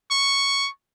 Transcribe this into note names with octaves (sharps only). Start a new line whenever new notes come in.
C#6